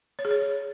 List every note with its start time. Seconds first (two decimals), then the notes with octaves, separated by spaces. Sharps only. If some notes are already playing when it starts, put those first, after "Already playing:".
0.19 C#5
0.25 G#4
0.31 C#5